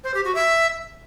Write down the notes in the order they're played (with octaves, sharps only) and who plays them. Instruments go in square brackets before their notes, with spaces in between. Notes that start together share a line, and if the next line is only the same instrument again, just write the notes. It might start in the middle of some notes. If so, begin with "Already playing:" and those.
[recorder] C5
G4
F#4
E5